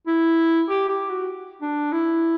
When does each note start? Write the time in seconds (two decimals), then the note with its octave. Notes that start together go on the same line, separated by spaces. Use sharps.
0.07 E4
0.69 G4
0.89 G4
1.10 F#4
1.62 D4
1.92 E4